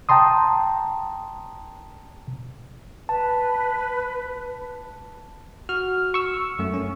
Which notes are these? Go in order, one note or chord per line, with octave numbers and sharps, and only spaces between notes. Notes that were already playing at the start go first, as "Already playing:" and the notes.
G5 A5 A#5 C6 D#6
B4 A5
F#4 F6
C#6 E6
F#2 A3
C#4